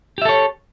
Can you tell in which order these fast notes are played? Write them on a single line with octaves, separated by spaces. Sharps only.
G4 E5 A4 C#5